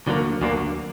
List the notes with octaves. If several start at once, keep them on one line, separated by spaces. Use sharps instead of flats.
D2 D3 F#3 A#3
D2 D3 F#3 A#3